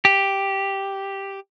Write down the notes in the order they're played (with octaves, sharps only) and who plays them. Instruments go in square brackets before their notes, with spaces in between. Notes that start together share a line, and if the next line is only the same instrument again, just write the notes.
[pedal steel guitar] G4